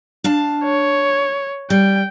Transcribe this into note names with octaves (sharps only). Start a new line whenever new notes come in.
D4 F5 A5
C#5
G3 G5